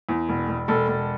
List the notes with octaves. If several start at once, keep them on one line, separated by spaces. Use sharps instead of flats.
E2
E1
E1
E1 A4
E1